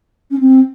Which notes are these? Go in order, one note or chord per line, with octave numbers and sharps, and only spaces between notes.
C#4
C4